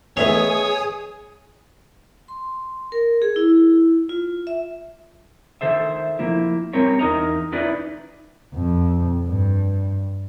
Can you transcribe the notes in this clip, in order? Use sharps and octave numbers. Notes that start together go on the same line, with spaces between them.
A1 B3 C#4 G#4 C#5 D#5 E5 D#6
C6
A#4
G#4
E4
F4
E5
D#3 A4 C5 E5
F3 A#3 E4
G3 C4 C#4 A#4 C#5
E2 D#4 A#4 D#5 A#5
C#4 D#4 E4 B4 D5
F2
G2